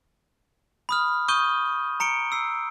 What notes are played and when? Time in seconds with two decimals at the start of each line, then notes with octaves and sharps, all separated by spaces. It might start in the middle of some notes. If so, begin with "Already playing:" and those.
0.89 B5 D#6 F6
1.28 C#6 D#6 F6 G6 D#7 G7
2.00 A#5 C#7 D7 G7
2.32 E6 C7